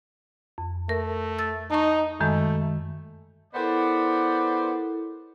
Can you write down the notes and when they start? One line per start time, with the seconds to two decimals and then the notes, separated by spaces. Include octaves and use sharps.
0.58 F2
0.89 A3 A#4
1.39 E6 A6
1.71 D#4 A5 C#6
2.20 F#2 D#3 G#3 A3
3.54 B3 E4 A4 A#4 C5 D5